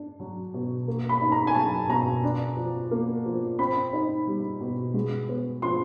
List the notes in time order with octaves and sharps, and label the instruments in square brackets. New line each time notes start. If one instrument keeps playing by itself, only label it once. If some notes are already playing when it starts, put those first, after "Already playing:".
Already playing: [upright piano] D4
F#3
B2
A#3
B5
D#4
A#5
G#5
F#3 A5
B2 A#5
D4
F3
A#3
F3
C4 B5
D#4
G3
B2
G#3
B3
F3 C6